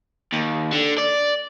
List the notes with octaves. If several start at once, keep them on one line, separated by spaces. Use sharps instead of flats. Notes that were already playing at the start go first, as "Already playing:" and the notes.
D#2
D3
D5